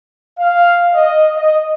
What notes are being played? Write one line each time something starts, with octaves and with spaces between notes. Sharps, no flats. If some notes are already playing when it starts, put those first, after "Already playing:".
F5
D#5
D#5